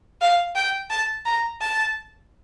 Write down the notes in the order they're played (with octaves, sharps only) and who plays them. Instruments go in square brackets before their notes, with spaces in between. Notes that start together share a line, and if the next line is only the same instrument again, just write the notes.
[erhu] F5
G5
A5
A#5
A5